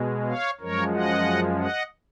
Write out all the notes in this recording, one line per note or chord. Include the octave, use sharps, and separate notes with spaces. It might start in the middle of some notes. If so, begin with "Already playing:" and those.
Already playing: B2 G#3
C#5 F5
F#2 F3 G#3 A#4 C#5
D#5 F#5
D#5 F#5